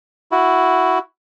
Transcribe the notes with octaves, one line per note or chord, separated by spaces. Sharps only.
E4 F#4